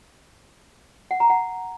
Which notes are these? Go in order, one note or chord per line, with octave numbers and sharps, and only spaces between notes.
F#5
A#5
F#5